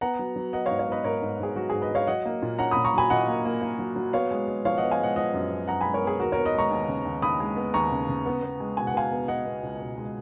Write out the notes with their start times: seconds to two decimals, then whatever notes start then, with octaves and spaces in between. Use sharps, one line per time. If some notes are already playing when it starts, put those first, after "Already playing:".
0.01 B3 F#5 A#5
0.19 F#3
0.36 F#3
0.53 B3 D#5 F#5
0.66 C#5 F5
0.71 G#2
0.79 C#5 F5
0.87 B3 B4 D#5
1.04 G#2 A#4 C#5
1.22 G#2
1.40 G#2 G#4
1.56 F#3 F#4
1.70 G#2 G#4
1.82 B4 D#5
1.91 F#3 C#5 F5
2.07 F#3 D#5 F#5
2.25 A#3
2.42 A#2
2.59 C#4 F#5 A#5
2.71 B5 D#6
2.77 A#2
2.85 A#5 C#6
2.94 F#3 G#5 B5
3.10 A#2 D#5 F#5
3.28 A#3
3.45 A#3
3.62 A#3
3.79 F#3
3.96 F#3
4.13 B3 C#5 F5
4.31 G#3
4.48 G#3
4.65 F3 C#5 F5
4.77 D#5 F#5
4.83 B3
4.91 F5 G#5
5.00 G#3 D#5 F#5
5.16 F3 D#5 F#5
5.34 F#2
5.51 B3
5.68 F#2 F#5 A#5
5.81 G#3 G#5 B5
5.94 A#4 C#5
6.02 B3
6.07 G#4
6.19 D#2 F#4 A#4
6.32 A#4 C#5
6.37 B3
6.45 B4 D#5
6.55 G#3 A#5 C#6
6.71 D#2
6.88 C#3
7.05 D#2
7.22 D#2 B5 D#6
7.40 G#3
7.56 B3
7.74 D#2 A#5 C#6
7.92 C#3
8.09 C#3
8.26 B3
8.42 B3
8.60 G#3
8.77 B2 G#5
8.87 F#5
8.94 B2 F5 G#5
9.11 B3
9.28 B3 D#5 F#5
9.45 B3
9.63 C#2
9.80 B2
9.98 G#3